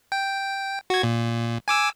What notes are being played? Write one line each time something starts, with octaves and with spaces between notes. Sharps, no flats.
G5
F#4 G#6
A#2
G#5 D6 E6